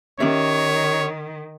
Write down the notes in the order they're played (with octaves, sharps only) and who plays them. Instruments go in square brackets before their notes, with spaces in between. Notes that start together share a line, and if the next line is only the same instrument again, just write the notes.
[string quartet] D#3 [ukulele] C#4 G4 E5 [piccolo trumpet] C#5